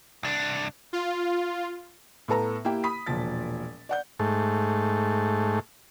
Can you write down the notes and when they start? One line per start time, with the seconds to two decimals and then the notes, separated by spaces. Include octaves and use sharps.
0.23 C2 D4
0.93 F4
2.28 A2 B3 A4 A#5
2.65 A#3 E4 G4 G5
2.84 B5 D#6 B6
3.07 E1 A#2 F3 A6
3.89 D5 F#5 G6
4.19 G#2 A3